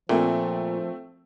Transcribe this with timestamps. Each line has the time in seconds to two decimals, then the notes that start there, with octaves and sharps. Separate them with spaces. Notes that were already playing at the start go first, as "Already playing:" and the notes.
0.09 A#2 F3 A3 C4